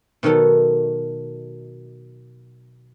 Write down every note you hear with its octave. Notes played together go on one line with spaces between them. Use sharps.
B2 D#3 F#3 A4 A#5